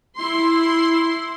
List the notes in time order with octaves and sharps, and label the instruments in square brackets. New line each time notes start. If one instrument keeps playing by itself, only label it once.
[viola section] E4 C6